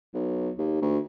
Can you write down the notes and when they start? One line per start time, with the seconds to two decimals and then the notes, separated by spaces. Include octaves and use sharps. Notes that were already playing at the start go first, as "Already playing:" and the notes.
0.14 B1
0.58 D#2
0.82 D2